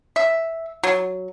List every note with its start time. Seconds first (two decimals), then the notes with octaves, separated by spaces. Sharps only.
0.16 E5
0.83 F#3